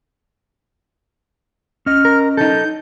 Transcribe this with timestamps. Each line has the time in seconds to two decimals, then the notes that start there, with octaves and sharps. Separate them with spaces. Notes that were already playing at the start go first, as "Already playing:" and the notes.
1.86 C#4 D#5 F6
2.05 A#4
2.37 D#4 A4 G6